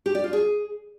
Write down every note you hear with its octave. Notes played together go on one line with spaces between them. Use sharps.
G4
D5
F4
G#4